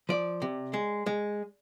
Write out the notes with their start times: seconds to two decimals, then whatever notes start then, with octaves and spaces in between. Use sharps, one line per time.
0.09 F3 D5
0.42 C3
0.74 G#3
1.06 G#3